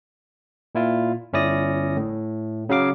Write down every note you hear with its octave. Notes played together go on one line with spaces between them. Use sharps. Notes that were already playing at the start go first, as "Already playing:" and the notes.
A#2 E4 F4
G1 C#4 E4 D5 D#6 A#6
A2
C#3 F#3 F5 D6